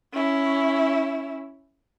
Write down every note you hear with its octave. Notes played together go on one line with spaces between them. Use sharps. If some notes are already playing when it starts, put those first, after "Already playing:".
C#4 E4